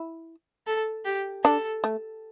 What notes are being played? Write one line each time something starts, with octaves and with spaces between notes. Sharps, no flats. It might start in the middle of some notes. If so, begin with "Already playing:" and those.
Already playing: E4
A4
G4
D4 A4
A3